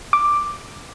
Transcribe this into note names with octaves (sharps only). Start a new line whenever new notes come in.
D6